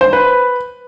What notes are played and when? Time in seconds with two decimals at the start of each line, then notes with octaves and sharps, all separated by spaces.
0.01 C5
0.13 B4